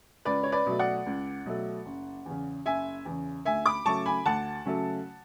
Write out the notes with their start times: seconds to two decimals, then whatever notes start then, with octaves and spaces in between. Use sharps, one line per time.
0.25 C#2 B4 D5
0.43 C#5
0.52 B4 D5
0.66 B2 F#3 A3
0.79 D5 F#5
1.06 C#2
1.46 B2 F#3 A3
1.86 F#1
2.26 E2 C#3
2.66 F#1 E5 G#5
3.05 E2 C#3
3.45 D2 E5 G#5
3.66 B5 D6
3.85 C#3 F#3 A3 A5 C#6
4.06 G#5 B5
4.25 D2 F#5 A5
4.65 C#3 F#3 A3